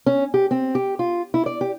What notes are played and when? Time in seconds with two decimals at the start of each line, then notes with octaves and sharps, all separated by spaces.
0.06 C#4
0.34 G4
0.51 C4
0.75 G4
0.99 F4
1.34 E4
1.46 D5
1.61 G4